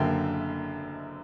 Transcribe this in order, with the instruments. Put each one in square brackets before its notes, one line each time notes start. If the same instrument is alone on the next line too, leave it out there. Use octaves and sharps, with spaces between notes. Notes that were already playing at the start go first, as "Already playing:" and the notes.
Already playing: [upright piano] F#1 F#2 D3 A#3 E5 G5